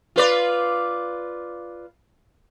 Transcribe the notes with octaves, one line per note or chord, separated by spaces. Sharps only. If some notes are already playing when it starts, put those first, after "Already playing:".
F4 B4 D5